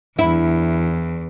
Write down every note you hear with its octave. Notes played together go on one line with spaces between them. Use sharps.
E2 E4